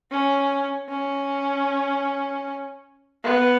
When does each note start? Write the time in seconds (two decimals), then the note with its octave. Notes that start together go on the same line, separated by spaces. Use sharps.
0.11 C#4
0.89 C#4
3.24 B3